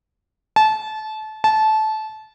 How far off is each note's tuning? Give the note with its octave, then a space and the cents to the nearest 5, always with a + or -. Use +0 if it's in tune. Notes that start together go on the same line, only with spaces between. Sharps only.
A5 -25
A5 -20